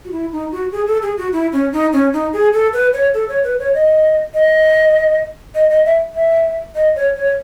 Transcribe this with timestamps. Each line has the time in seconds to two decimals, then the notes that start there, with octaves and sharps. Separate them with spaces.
0.05 F#4
0.12 E4
0.32 D#4
0.52 F#4
0.72 G#4
0.87 A4
1.02 G#4
1.18 F#4
1.33 E4
1.53 C#4
1.73 D#4
1.93 C#4
2.13 D#4
2.33 G#4
2.54 A4
2.73 B4
2.93 C#5
3.14 A4
3.29 C#5
3.44 B4
3.59 C#5
3.74 D#5
4.34 D#5
5.55 D#5
5.70 D#5
5.85 E5
6.15 E5
6.75 D#5
6.96 C#5
7.16 C#5